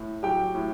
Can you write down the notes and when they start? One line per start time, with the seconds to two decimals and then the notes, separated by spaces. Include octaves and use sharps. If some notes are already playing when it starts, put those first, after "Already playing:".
Already playing: A2
0.23 F#3 G4 G5
0.55 A2